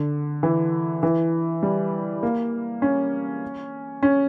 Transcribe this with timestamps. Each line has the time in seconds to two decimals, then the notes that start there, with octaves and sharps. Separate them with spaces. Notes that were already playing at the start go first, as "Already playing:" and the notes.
Already playing: D3
0.43 E3
1.03 E3
1.63 G3
2.23 A#3
2.82 C#4
4.03 C#4